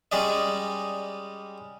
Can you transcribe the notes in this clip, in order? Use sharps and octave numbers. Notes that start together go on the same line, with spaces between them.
G3 G#3 C#4 D5 D#5